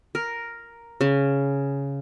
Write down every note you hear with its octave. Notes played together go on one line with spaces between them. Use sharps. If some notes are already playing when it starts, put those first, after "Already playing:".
A#4
C#3